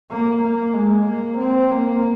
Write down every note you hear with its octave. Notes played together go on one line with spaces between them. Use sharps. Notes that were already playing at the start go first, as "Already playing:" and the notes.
A#3
A#3
G#3
A#3
C4
A#3